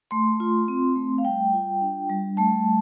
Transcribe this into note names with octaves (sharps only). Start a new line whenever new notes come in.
A3 C6
F4
C4
A3
F5
G3 G5
F4
D4
G3
A3 A5